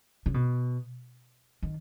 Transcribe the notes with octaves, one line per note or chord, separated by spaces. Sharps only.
C#3
B2
D#3